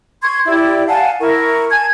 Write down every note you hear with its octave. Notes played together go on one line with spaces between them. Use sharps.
C6 C#6 G#6
E4 G4 D5
F5 F#5 G#5 A5
E4 A#4 C#6
G#5 A5 G#6